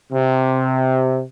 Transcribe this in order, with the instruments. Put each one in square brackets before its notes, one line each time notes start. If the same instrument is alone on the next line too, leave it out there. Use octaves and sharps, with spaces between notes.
[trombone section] C3